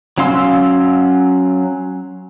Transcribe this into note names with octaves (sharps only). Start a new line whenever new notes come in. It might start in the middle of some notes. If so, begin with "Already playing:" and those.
F#3 C#4 F5 C6 E6